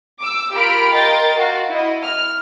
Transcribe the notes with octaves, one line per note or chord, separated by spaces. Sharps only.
D6 E6
F4 G4 A#4 B5 F6 D7
A#4 D#5 G5 C6 A6
F#4 F5
E4 D#5
F6